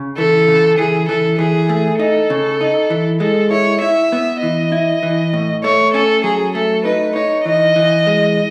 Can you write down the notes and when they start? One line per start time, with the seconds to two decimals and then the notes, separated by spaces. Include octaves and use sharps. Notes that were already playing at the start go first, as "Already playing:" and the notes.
Already playing: C#3
0.17 E3 A4
0.48 C#3
0.78 E3 G#4
1.08 E3 A4
1.39 E3 G#4
1.69 A3
1.99 D#4 A4
2.30 C#3
2.61 D#4
2.90 E3
3.20 G#3 A4
3.51 E4 C#5
3.82 E4 E5
4.12 B3
4.42 E3 D#5
4.72 E4
5.03 E3
5.33 A2
5.64 A3 C#5
5.93 C#4 A4
6.24 F#3 G#4
6.55 A3 A4
6.85 D#4 B4
7.16 D#4 C#5
7.45 E3 D#5
7.76 E3
8.07 G#3